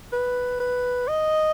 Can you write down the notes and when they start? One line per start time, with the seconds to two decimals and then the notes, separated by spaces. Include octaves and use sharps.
0.12 B4
0.60 B4
1.08 D#5